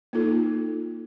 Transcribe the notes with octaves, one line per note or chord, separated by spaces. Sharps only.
A#3 D#4 F4 A4